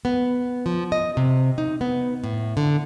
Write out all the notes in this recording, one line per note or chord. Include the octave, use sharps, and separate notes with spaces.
B3
F3
D#5
C3
D#4
B3
A2
D3